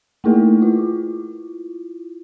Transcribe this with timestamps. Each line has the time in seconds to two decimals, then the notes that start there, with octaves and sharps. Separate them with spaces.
0.24 A3 A#3 D#4 E4 G#4 A#4
0.61 E4 F4